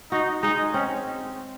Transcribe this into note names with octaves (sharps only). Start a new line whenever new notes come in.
D#4 F#4
G#3 D#4
C4 C#4